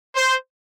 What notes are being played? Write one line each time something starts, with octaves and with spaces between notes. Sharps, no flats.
C5